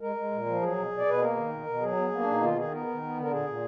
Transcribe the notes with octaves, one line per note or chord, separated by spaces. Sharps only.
G#3 A#4
G#3
A#2
F3
F#3 G#4
B2
B2
D5
B2 B4
A#3 A#4
D#3
B2
B2
F#3 G#4
B3
A#3 B3
D4
B2
D#4
D#3 F4
D#3 G#4
B3 A#4
D#3
B3
D3 A#4
A#2 G#4
A#2